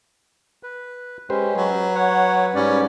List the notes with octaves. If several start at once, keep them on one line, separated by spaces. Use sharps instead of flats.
B4
G#3 C#4 G4 B4 C5
F#3 B4
C#5 F#5
G#2 G3 C#4 D5